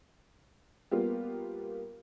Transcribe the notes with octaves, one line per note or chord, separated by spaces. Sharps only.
G3 A#3 B3 F4 G4